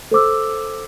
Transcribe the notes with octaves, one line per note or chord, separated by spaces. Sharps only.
A4 C5 D6 E6